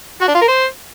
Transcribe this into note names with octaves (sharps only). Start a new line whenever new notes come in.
F#4
D4
F4
A#4
C5